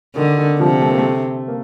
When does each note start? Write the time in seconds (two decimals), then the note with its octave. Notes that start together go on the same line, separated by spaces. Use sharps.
0.15 D3 D#3
0.38 D#3
0.59 C3 F3
0.81 A3
0.90 A#3
0.98 A3
1.48 A#3